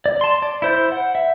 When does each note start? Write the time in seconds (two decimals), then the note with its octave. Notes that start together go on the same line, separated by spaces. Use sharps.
0.06 D5
0.21 A5 C6
0.42 D5
0.62 E4 C5 G6
0.92 F#5
1.15 E5